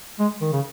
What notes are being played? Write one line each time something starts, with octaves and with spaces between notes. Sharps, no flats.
G#3
D#3
C#3